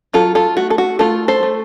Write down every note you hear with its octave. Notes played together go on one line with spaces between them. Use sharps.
F#3 F4 A4
F4 A4
A3 F#4
A4
F#4
A3 F4 A4
A4 C5
A3